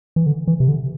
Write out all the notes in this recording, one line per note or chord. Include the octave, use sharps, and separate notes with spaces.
E3
D3
E3
C3
D3